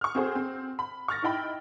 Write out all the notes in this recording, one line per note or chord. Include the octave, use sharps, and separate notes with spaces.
C#6 F6
C4 F#4 G#4 A4 C5
C4
B5
C#6 F6 A6 A#6
D#4 E4 G5 B5